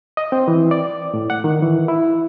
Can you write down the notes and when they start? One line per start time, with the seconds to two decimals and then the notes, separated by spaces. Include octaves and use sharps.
0.17 D#5
0.32 C4
0.48 E3
0.71 D5
1.14 A2
1.30 F#5
1.44 D#3
1.62 E3
1.88 E4